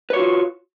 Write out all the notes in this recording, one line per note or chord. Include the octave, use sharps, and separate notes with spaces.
F4 F#4 B4 C#5